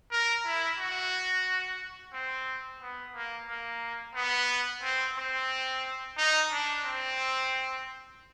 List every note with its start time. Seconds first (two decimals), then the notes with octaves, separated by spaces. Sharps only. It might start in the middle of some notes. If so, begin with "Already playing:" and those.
0.11 A#4
0.46 E4
0.79 F#4
2.13 C4
2.81 B3
3.15 A#3
3.49 A#3
4.15 B3
4.82 C4
5.17 C4
6.17 D#4
6.52 D4
6.85 C4